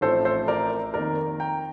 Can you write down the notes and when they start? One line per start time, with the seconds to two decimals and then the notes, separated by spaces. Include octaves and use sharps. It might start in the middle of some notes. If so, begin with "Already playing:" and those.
0.01 A1 A2 F3 C4 A4 C5
0.25 A4 C5
0.48 A#4 D5
0.94 F2 D#3 A#3 A#4 D5
1.40 G5 A#5